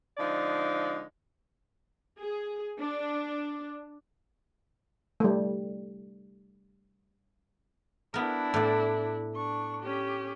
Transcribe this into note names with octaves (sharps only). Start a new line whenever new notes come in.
D3 F3 G#3 D#4 D5
G#4
D4
G3 A3
B3 D4 E4 A#4
A2 D5
D4 C#6
C#4 G4